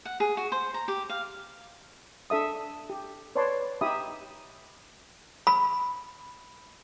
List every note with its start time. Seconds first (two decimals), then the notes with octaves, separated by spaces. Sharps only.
0.05 F#5
0.20 G#4
0.37 F#4
0.52 C5
0.74 A#5
0.88 G4
1.09 F5
2.30 D4 A4 E5 D#6
2.90 G4
3.35 B4 C#5 D5 A5 C6
3.81 D#4 G4 E5 B5 D#6
5.47 B5